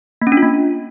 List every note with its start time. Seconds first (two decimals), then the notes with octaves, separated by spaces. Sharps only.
0.22 A#3
0.27 C#4
0.32 D4
0.37 F4
0.42 A#3